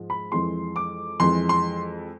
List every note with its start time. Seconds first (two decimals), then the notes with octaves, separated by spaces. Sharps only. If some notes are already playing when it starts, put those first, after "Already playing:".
Already playing: G#2 F3 G#3
0.10 B5
0.32 F2 E3 G#3 C6
0.76 D6
1.20 F2 E3 G#3 C6
1.49 C6